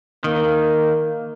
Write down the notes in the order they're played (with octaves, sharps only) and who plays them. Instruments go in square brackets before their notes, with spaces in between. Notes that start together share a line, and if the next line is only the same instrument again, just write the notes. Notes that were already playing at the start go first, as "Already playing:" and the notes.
[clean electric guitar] D#3 [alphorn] A#3